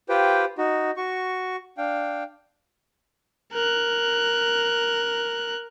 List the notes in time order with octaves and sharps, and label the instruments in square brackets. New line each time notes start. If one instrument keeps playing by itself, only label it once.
[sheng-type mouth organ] F4 G4 B4 C5 G5
D#4 F#4
F#4 C#6
D4 F5 G5
[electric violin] A#4 F#6